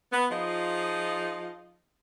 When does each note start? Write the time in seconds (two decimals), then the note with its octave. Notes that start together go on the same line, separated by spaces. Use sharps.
0.12 B3
0.30 F3 D#4 F4 G#4 D#5